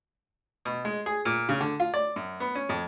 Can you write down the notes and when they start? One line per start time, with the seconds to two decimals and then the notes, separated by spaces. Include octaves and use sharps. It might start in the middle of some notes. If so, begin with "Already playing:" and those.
0.65 B2
0.85 G#3
1.06 G#4
1.25 A#2
1.49 C#3
1.61 D3
1.80 F4
1.94 D5
2.16 F#2
2.40 B3
2.55 C#4
2.69 F2